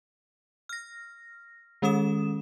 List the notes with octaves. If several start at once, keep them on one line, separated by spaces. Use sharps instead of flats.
F6 A#6
D#3 G#3 C#4 A4 D#6 E7